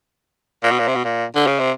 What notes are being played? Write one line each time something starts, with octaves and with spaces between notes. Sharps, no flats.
A#2
B2
A#2
C3
B2
A#2
D3
C#3
C3